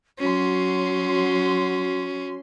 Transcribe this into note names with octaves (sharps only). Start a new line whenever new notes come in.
F#3 C#4 F#4 C6